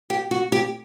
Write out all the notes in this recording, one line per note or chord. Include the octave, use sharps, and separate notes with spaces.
G4
F#4
G4